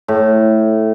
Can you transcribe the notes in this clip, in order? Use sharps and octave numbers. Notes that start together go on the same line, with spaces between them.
A2